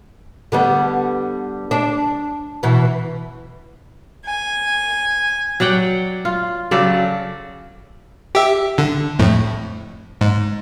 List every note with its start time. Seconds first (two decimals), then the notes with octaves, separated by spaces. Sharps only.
0.52 D3 G3 B3
1.71 D4
2.63 B2 E3
4.26 G#5
5.60 F#3 D5 F#5 G5
6.25 F4
6.71 C#3 F#3 A4 D5
8.35 G4 E5
8.78 D3
9.19 F2 A2
10.21 G#2